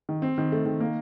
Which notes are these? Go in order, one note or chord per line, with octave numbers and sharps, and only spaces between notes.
D#3
C4
D#3
A3
D#3
A#3